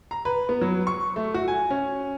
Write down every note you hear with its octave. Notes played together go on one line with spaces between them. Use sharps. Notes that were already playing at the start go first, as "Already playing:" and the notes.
A#5
B4
B3
F#3
C#6
A3
F#4
G#5
C#4